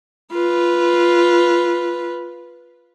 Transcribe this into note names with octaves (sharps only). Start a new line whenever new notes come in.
F4 B4